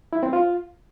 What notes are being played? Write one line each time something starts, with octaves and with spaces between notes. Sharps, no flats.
E4
C4
F4